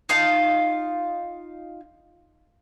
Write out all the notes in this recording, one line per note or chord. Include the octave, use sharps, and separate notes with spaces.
D#4 F4 F5 A5